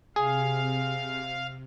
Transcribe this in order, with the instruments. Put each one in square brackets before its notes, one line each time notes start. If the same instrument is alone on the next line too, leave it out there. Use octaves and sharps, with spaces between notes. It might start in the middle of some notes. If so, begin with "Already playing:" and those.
[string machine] C3 [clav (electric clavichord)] G#4 [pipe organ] F5